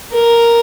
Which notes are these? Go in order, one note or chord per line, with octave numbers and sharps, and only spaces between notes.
A#4